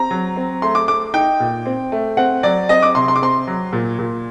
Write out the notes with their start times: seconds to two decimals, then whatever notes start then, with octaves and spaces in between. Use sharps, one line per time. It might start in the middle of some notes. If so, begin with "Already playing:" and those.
Already playing: C4 A#5
0.11 F#3
0.36 C4
0.62 A3 C6
0.75 D6
0.88 A3 D6
1.14 D#4 G5
1.40 A#2
1.66 C4
1.92 A3
2.17 C4 F#5
2.43 F#3 D5
2.69 C4 D#5
2.83 D6
2.95 C3 C6
3.08 C6
3.16 D6
3.21 C4 C6
3.47 F#3
3.73 A#2
3.99 A#2